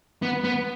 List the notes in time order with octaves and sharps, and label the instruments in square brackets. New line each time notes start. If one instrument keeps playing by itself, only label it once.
[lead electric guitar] B3
B3